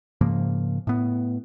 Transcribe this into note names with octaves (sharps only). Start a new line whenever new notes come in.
G#2 C#3 F3 A#3
A2 B3